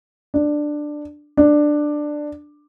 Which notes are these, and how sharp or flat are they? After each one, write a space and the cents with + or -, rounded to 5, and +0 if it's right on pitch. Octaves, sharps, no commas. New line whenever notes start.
D4 +10
D4 +10